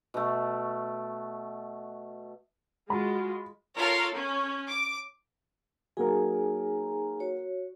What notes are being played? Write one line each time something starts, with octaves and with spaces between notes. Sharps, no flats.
B2 A3
G#3 F4 F#4 B5
F4 A4 A#4 C#5 F5
C#4
D6
F#3 A#3 D#4 G#4 A#4 G#5
F#4 C#5